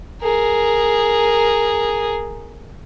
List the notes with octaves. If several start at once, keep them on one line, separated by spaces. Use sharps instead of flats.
G#4 A#4